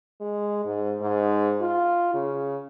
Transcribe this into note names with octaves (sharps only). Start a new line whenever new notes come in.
G#3
G#2
G#2
F4
C#3